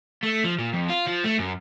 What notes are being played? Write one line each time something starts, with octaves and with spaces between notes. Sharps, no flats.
A3
F3
A#2
F2
F4
F3
A3
F#2